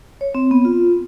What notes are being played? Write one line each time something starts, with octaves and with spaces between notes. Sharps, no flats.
C#5
C4
B3
F4